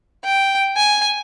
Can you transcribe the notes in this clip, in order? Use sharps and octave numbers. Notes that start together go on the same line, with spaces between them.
G5
G#5